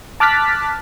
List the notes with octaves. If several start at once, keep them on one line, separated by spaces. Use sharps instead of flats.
A5 D6 F6 F#6 A6 B6